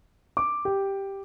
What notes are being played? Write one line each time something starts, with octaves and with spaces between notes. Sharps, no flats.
D6
G4